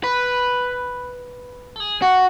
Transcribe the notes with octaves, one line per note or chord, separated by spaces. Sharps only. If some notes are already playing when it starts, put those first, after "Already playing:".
B4
A4
G#4
F#4